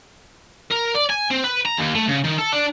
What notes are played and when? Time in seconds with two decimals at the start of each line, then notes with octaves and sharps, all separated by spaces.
0.71 A#4
0.95 D5
1.10 G#5
1.31 C4
1.44 B4
1.65 A#5
1.77 D#2
1.95 A3
2.08 C#3
2.24 D#3
2.38 A4
2.52 D4